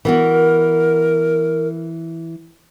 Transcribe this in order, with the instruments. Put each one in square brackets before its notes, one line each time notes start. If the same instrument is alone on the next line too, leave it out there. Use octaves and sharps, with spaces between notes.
[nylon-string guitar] E3 B3 F#4 [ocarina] A#4